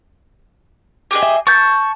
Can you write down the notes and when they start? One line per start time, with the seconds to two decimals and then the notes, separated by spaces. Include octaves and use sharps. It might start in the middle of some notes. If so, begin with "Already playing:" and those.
1.11 G4 G#4 D#5
1.23 E5
1.47 A5 C#6 G6